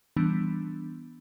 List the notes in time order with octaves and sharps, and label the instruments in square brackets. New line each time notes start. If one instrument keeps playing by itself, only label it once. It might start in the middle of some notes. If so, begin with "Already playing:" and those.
[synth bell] E3 G3 B3 D4